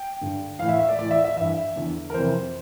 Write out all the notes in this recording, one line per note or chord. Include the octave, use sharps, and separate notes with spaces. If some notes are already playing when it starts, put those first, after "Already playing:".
Already playing: G5
G2 D3
A2 E3 F5
E5
E5
D5
A2 E3 D5
E5
E5
G2 E3 E5
E2 D3
A#4
F2 C3 E3 C5